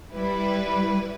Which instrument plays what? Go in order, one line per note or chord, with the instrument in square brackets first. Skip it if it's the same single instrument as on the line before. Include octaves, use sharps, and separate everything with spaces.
[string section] G3 E4 B4